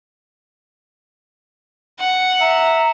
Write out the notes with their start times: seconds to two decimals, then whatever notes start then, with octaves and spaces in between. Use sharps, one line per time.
1.99 F#5
2.41 E5 A#5